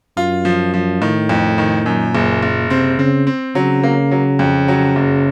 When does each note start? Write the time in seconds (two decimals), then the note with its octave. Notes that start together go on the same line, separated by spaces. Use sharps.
0.17 F#2 F4
0.45 F3
0.74 F3
1.01 A2 D#3
1.29 F2
1.58 D#3
1.86 F#2 A#2
2.15 F#1
2.43 F#1
2.70 C3 C4
2.99 C#3 C4
3.27 C4
3.55 C#3 F#3
3.83 A#3
4.11 F#3
4.39 F2
4.68 F#3
4.96 F#1